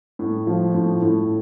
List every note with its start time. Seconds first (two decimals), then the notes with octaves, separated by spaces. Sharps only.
0.19 A2
0.47 F3
0.74 A2
1.02 A2